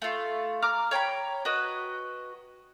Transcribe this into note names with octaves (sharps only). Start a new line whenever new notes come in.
A3 F4
A#5 D6 F6
C#5 G5 A#5 B5
F#4 B4 D#5